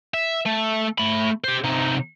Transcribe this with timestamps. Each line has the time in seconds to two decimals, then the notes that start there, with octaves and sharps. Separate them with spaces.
0.14 E5
0.46 A3
0.98 A3 B5
1.44 G4 C5
1.64 C3 D#4